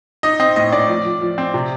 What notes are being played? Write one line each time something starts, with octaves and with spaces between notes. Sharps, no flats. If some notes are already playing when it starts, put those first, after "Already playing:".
D#4 D#5
C4 D#5
A2 D#5
A2 D5
F3
F3
F3
C4
C3